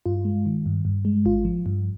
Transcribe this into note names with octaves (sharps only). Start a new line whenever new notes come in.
G2 F4
G#3
D#3
G2
G2
G#3
G#1 F4
F3
G2